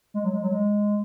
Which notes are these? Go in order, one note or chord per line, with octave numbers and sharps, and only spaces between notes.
G#3
F#3
G#3
F#3
G#3